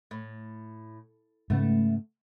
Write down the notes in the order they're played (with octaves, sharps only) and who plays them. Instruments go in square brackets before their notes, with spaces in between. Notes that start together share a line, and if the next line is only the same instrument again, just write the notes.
[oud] A2
[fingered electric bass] G#2 C#3 [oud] A3 B3